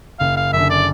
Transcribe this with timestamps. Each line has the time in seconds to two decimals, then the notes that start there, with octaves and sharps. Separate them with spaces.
0.19 F#1 F5
0.37 F5
0.53 F#2 D3 E5
0.70 D5